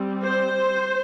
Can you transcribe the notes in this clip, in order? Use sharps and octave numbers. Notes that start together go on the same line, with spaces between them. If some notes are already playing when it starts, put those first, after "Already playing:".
Already playing: G3 C4
C5